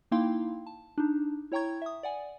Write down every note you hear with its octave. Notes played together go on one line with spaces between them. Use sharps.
A#3 D#4 E4 F5 G5 C6
A5
D4 D#4
E4 C#5 G5 A#5 C#6 G#6
E5 D#6
D5 F#5 G#5